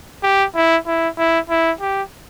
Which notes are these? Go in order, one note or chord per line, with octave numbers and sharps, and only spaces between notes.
G4
E4
E4
E4
E4
G4